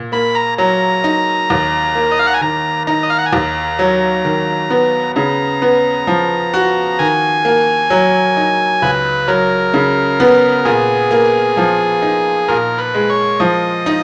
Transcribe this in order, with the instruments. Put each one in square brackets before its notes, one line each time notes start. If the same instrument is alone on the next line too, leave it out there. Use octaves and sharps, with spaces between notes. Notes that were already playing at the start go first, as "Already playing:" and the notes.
Already playing: [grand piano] A#2
[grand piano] A#3 [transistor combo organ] B5
[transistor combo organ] A#5
[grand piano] F#3 [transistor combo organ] A#5
[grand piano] D#4
D#2
A#3
[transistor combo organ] D#5
F5
F#5
G#5
[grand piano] D#3 [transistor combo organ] A#5
[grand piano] D#4 [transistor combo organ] A#5
[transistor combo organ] D#5
F5
F#5
G#5
[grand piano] D#2 [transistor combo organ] A#5
[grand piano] F#3
D#3
B3
[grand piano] C#3 [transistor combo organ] A#5
[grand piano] B3
F3
F#4
[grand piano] D#3 [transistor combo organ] G#5
[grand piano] A#3
F#3
D#4
[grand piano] C#2 [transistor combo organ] B4
[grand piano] F#3 [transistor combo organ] A#4
[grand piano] C#3
B3
[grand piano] A#2 [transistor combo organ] G#4
[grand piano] A#3
F3
D#4
[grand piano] A#2 [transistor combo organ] A#4
[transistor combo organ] B4
[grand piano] G#3
[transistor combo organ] C#5
[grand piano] F3 [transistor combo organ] D#5
[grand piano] D#4